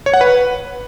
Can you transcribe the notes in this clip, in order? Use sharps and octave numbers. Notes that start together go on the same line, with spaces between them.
C#5
F#5
B4